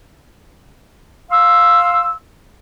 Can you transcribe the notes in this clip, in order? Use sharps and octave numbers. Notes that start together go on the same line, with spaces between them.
F5 C6 E6